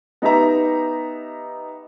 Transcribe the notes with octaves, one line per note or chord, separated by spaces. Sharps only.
B3 D#4 G4 E5 A#5